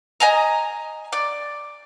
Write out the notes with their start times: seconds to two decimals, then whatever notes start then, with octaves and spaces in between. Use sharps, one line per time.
0.20 D#5 G#5 A#5
1.13 D5